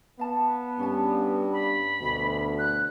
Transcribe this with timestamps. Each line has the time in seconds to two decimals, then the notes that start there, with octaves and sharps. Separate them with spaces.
0.19 B3 F5 A5
0.79 G2 C#4 A5
1.53 B5
2.01 D2 B2
2.59 F#6